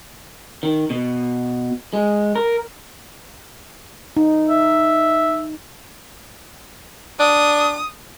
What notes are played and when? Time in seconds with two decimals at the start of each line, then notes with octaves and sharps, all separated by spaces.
0.63 D#3
0.90 B2
1.93 G#3
2.36 A#4
4.17 D#4
4.48 E5
7.20 D4 D#6